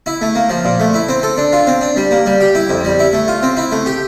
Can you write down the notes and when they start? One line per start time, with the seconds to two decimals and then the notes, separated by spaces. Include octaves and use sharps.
0.06 E4
0.21 A3
0.35 A#3
0.50 F3
0.65 A#2
0.80 A3
0.94 E4
1.09 C4
1.23 A4
1.38 D4
1.53 F4
1.67 C4
1.81 D4
1.96 G3
2.11 A#3
2.26 G3
2.41 G4
2.55 E4
2.70 F2
2.85 G3
2.99 E4
3.13 A3
3.28 F4
3.43 C4
3.57 E4
3.72 A3
3.86 G4